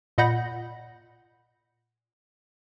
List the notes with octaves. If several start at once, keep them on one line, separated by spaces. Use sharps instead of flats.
A#2 D#5 F#5 B5 G6 A#6